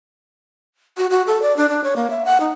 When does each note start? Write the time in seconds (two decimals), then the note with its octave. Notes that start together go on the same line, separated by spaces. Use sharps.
0.97 F#4
1.10 F#4
1.27 A4
1.42 D5
1.57 D4
1.69 D4
1.84 C#5
1.96 A#3
2.10 E5
2.25 F#5
2.40 D#4